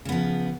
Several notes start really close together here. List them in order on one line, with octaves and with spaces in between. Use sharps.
C#3 B3 F3